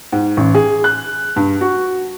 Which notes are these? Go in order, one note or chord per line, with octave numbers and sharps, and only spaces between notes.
G#2
A1
G#4
F#6
G2
F#4